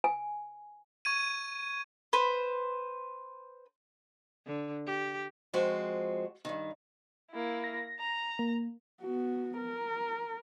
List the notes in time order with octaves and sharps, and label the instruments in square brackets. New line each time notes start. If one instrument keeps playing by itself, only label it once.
[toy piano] G#5
[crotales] C#6 G#6 D#7
[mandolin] B4 C5
[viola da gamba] D3
G4
[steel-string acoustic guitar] F3 G#3 C4 F#4
G2 D#3
[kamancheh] A#3 E4
[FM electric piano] A#6
[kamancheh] A#5
[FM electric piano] A#3
[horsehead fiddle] B3 F#4
A#4